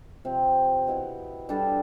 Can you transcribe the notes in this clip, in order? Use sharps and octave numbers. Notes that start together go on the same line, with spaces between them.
C3 F3 C4
B2 B3 E4
G3 D4 A4